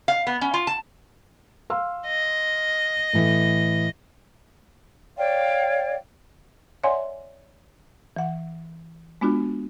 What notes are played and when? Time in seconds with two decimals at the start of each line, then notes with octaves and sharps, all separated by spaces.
0.08 F5
0.27 B3
0.41 C#4
0.54 F4
0.67 A5
1.70 F5 C6 E6
2.07 D#5
3.13 A2 E3
5.16 C#5 D5 F5 G5
6.84 C#5 D5 E5 F#5 G#5 C6
8.16 E3 F#5
9.21 G#3 B3 D4 F4 F#4